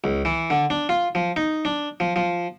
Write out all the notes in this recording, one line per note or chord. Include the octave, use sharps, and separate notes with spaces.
C#2
E3
D3
D4
F4
F3
D#4
D4
F3
F3